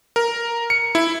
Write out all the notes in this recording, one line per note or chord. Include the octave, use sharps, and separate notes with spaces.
A#4
C#7
E4